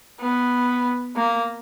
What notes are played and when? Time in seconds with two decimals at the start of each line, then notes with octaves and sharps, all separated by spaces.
0.21 B3
1.16 A#3